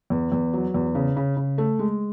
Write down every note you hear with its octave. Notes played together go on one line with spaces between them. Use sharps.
E2
E2
F#3
E2
C#3
C#3
C#3
A3
G#3